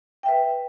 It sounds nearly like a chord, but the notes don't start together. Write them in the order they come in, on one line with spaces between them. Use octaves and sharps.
G5 E5 B4